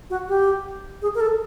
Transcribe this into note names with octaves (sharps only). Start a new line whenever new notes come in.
F#4
G4
G#4
A#4
A4